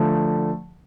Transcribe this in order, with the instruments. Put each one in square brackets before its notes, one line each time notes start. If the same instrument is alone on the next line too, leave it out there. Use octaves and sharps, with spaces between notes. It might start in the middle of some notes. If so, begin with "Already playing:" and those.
Already playing: [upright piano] D3 F3 A3